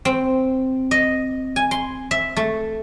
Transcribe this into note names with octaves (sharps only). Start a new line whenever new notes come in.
C4
D#5
G#5
C6
E5
A3